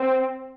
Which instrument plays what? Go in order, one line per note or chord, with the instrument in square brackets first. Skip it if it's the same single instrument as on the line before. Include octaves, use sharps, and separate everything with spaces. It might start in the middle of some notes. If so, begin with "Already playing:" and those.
Already playing: [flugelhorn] C4